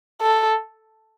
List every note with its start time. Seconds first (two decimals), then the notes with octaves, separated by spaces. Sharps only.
0.22 A4